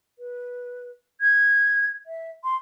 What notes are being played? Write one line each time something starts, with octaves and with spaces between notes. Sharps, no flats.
B4
G#6
E5
C6